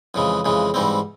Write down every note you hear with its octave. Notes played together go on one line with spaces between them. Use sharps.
F2 C#3 E3 G#3
F2 C#3 E3 G#3
G#2 E3 G3 C4